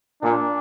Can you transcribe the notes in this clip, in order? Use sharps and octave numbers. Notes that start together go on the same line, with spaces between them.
A#2 D4